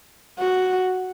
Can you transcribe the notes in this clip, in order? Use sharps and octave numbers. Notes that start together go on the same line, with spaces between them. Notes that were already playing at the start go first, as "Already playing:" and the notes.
F#4